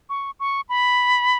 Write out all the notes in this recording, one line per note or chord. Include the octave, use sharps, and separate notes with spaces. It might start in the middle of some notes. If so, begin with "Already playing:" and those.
C#6
C#6
B5